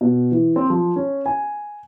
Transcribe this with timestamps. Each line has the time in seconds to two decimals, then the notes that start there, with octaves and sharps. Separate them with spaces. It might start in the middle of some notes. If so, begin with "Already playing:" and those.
0.01 B2
0.32 E3
0.56 C4
0.70 F3
0.96 C#4
1.26 G#5